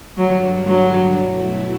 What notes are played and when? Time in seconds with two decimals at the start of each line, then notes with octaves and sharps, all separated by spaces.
0.17 G2 D3 F#3 G3 D4
0.67 F#3
1.16 B2 F#3 A3 E4